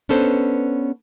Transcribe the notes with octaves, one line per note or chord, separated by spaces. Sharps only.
B3 C#4 D4 A4 B4 C5